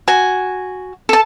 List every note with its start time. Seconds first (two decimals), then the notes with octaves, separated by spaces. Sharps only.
0.08 F#4 G#5
1.09 A4 A5